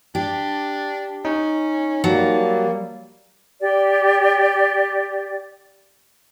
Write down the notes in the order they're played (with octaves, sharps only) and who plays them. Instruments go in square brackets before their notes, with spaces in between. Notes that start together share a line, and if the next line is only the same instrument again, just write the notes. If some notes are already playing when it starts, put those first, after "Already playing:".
[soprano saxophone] D4 [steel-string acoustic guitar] G4
[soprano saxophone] C#4 [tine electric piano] D#4
[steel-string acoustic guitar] F#3 [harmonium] G3 A#3 [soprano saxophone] A5
[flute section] G4 D5